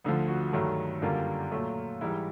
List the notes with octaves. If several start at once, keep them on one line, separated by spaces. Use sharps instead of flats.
D2 D3 F3
F#4
G2 D#3 F#3 A3
F#2 D3 G3 A#3 F4
A#2 F#3 A3
G#2 E3 G3 E4